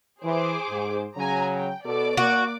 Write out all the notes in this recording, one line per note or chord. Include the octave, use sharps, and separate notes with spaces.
E3 G#4 C5 D6
G#2
C#3 F#3 G#5 A#5
G5
B2 A4 D5 D6
A#3 F#4